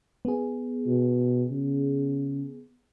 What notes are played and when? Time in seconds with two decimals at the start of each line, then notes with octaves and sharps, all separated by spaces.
0.25 B3 G#4
0.87 B2
1.51 C#3